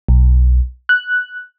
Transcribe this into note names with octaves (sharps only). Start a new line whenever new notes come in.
B1
F#6